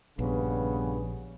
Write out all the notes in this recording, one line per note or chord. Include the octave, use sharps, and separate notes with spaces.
A#1 G2 C#3 B3